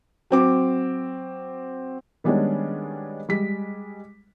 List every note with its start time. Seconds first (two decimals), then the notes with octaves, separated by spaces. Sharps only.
0.30 F#3 C4 D6
2.24 D#3 G3 G#3 B3 C#4 D4
3.29 G3 G#3 B6